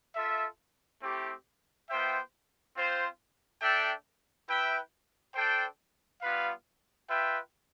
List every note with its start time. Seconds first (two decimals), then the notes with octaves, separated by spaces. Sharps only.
0.16 F4 A4 E5
1.02 A3 C4 E4 G4
1.89 B3 F4 C5 E5 G5
2.76 C4 F4 C5
3.62 D4 A4 E5 G5
4.49 E4 B4 E5 G5
5.35 D4 A4 C5 G5
6.22 G3 B3 F4 B4 F5
7.08 F4 B4 E5 G5